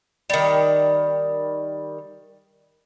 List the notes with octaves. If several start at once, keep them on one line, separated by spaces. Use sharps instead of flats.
D#3 G3